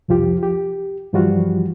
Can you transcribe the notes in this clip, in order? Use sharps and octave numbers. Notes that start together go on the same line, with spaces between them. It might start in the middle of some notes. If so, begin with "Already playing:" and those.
C2 F2 F3 F4 G4
G4
G2 E3 F3 G3 F4 F#4